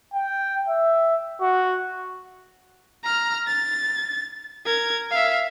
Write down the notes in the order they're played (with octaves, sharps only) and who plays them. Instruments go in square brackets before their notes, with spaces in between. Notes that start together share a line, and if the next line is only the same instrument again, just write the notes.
[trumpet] G5
E5
F#4
[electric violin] A#5 F6
A6
A#4 G#6
E5 F5